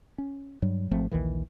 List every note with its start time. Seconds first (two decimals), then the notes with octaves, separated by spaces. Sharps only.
0.18 C#4
0.62 G2 F#3 G3
0.91 G#1 F3 A3 C4
1.11 A#1 D#2 D#3 E3